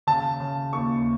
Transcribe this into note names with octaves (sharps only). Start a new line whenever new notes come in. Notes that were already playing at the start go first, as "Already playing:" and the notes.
C#3 A5
C#3
D#2 C#6